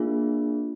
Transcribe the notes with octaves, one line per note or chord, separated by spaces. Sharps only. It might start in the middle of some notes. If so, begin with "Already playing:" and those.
Already playing: A#3 D4 F4 G#4